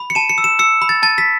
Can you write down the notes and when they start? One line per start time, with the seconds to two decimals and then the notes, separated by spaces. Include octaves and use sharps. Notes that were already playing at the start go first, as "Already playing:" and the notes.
Already playing: B5
0.10 C#7
0.15 A5 E7
0.29 C#7
0.38 E6
0.44 E7
0.59 E6 C#7
0.82 B5
0.89 A6
1.03 A5 A6
1.18 B6